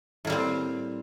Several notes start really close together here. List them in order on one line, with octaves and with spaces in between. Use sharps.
A2 A#3 G3 C4